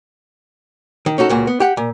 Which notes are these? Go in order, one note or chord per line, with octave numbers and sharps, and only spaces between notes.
D#3
C#4 D#4 F#4 A4
C#2 A#2 F#4
B3
G4 F#5
A#2